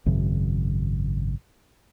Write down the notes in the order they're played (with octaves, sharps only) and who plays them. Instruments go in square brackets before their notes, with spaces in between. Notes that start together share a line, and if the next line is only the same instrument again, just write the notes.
[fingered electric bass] G#1 F#2 C#3